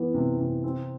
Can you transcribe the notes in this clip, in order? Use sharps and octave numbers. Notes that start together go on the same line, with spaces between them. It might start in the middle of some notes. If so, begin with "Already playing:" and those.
Already playing: E3 B3
C3
C3
C4